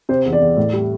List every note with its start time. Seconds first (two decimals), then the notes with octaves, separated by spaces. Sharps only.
0.09 C3 C5
0.26 E2
0.33 D5
0.41 E2
0.57 A2
0.73 G3